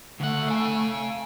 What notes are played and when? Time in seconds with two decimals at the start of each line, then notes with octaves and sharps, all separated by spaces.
0.20 D2 A3 F#5
0.48 F5 G#5